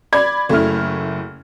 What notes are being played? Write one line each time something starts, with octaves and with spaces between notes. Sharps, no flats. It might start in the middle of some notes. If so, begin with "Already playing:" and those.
D5 B5 G#6
F#1 A3 E4 F6